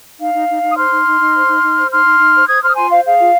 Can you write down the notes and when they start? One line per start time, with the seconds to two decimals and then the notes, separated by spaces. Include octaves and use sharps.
0.20 D#4 F5
0.34 D#4
0.49 D#4
0.63 D#4
0.70 D#6
0.77 C5 C6 F6
0.91 D#4
1.06 D#4
1.20 D#4
1.34 C5
1.47 D#4
1.62 D#4
1.76 C5
1.91 D#4 C6 F6
2.05 D#4
2.19 D#4
2.34 C5
2.47 C5 D#6 G#6
2.62 C5 C6 F6
2.69 D#6
2.76 F4 G#5 C6
2.90 C5 F5
3.05 G#4 F5
3.19 F4